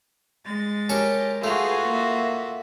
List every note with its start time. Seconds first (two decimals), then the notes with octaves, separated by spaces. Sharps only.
0.45 G#3 A6
0.89 C#4 G4 A#4 A5 C#6
1.44 A3 F4 F#4 G#4 B4
1.88 A#3 E5